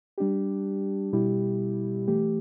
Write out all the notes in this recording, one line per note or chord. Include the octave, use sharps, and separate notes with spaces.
G3 D4 G4
B2 G3 E4 G4
E3 A3 G4